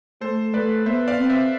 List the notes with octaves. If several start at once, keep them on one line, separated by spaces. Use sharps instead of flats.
A3 A4 C5
A3 B4 D5
B3 C5 E5
D5 F5
C4
C5 E5